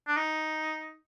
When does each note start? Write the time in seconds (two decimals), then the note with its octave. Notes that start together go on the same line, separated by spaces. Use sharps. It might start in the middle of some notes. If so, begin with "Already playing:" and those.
0.08 D4
0.17 D#4